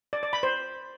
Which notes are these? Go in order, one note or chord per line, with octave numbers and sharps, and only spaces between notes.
D5
D5
B5
C5